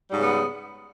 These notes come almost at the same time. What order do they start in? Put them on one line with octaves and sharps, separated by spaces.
G3 G#2 C#3 B3